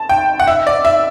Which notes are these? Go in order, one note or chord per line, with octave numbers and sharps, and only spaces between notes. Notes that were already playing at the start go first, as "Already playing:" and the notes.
Already playing: A5
G5
F#5
E5
D5
E5